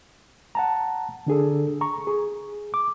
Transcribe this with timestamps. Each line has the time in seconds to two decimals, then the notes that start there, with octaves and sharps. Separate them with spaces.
0.55 F#5 A5 A#5
1.27 D3 D4 G#4 A4
1.81 A#5 C#6
2.07 G#4
2.74 D6